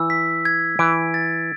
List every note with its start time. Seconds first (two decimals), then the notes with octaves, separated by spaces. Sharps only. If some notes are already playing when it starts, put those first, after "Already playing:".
Already playing: E3 E6
0.10 B6
0.45 G#6
0.79 E3 D7
1.14 A6